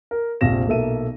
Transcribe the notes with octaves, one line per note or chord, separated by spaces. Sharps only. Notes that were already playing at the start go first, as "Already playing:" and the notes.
A#4
A#1 F2 C3 F5 A#6 E7
B1 A#2 A#3 A4 E5 D#7